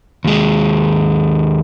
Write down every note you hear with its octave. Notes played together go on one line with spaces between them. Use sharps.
D#2 G#3